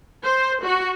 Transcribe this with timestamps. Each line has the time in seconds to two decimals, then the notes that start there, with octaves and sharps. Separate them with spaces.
0.23 C5
0.61 F#4